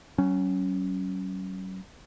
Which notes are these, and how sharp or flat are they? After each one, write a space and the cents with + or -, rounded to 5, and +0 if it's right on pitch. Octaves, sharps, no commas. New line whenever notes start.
F#3 +35 C#4 +0